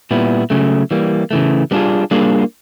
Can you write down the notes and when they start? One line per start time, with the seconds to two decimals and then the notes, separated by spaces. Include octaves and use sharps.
0.11 A#2 G3 B3 E4
0.50 C#3 F#3 A3
0.91 E3 G3 A#3
1.31 C#3 E3 A3
1.71 G3 B3 D4 F4 G#4
2.11 G3 A#3 D4 F4 G#4